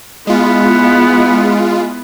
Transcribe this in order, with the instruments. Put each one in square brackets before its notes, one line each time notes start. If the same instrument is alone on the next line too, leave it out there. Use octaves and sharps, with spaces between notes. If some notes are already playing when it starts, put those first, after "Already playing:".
[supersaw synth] G#3 F4 [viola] B3 E4